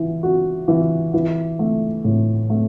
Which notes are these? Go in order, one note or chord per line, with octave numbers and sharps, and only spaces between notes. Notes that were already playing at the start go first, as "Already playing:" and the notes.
Already playing: E3
F#4
E3
E3
A3
A2
A3